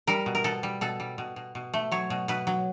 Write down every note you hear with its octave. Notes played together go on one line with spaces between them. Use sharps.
G3 A#4
B2
A#4
B2 A4
G3
B2 A4
G3
B2
B2
B2
A3
F#3 C#5
B2
B2 B4
F#3